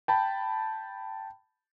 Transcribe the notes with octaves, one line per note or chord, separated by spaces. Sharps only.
G5 A5 B5